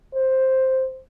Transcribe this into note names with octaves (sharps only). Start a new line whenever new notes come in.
C5